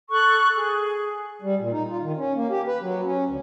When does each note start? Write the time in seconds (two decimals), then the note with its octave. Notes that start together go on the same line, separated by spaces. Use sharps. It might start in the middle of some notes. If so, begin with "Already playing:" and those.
0.10 A4 C#6 F#6
0.56 G#4
1.42 G3
1.59 A#2
1.72 D#4
1.89 F4
2.01 D#3
2.17 C#4
2.35 A#3
2.50 G4
2.67 B4
2.81 F#3
3.04 C#4
3.27 D2